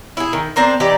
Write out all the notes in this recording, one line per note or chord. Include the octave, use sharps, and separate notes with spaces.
E4 G#4
D#3
C4 D4 A#4 C5
E3 D#4 G4 D5